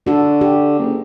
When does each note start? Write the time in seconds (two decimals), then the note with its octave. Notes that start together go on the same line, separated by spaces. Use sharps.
0.07 D3 F#4 A4
0.41 G4
0.79 F#1